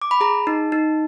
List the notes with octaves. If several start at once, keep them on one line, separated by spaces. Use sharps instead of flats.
D6
B5
G#4 A#5
D#4
D#4